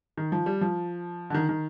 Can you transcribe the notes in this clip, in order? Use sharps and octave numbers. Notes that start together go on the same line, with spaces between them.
D#3
F3
G3
F3
D3
D#3
D#3